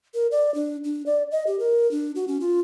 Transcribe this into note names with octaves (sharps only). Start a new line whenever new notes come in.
A#4
D5
D4
D4
D5
D#5
G4
A#4
D4
F#4
C#4
F4